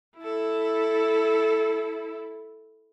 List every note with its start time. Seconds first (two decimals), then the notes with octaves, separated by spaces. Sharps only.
0.18 E4 A4